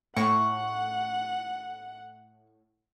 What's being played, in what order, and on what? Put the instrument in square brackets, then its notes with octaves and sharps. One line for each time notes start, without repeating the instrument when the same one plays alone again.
[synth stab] A2 [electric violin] F#5 [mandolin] C#6